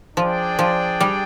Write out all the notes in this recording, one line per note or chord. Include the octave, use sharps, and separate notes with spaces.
F3 D4 G#4 D5 G5
F3
G3